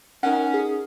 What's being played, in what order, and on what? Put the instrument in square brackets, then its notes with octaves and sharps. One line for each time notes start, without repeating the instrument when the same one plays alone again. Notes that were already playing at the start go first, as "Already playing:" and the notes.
[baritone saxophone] C#4 [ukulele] D#4 A#4 F#5
[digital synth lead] G#4